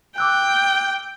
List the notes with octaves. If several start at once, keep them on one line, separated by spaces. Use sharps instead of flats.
G5 D6 E6 F#6